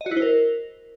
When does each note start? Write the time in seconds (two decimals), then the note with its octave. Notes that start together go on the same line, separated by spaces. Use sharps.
0.01 D#5
0.06 F#4
0.11 E4
0.17 C5
0.22 A#4